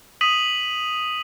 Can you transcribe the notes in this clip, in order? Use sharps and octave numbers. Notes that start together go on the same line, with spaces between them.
D#6 B6 D#7 F#7